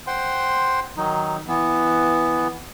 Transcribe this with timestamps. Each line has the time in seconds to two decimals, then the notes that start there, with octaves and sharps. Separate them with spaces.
0.07 C5 F#5 G5 C6
0.97 D#3 F#3 D#4
1.48 E3 B3